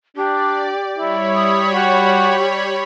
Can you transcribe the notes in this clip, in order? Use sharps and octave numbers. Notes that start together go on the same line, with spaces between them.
D4 G4 D5
G3 E4 C#5 B5
D#6
F#4 G4